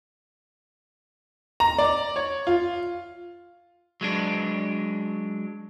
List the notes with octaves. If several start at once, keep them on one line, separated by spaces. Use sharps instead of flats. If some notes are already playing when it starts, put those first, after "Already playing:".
A#5
D5
C#5
F4
F#3 G#3 D4